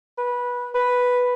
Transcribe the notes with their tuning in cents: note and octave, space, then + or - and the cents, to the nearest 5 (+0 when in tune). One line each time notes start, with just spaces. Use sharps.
B4 -15
B4 +0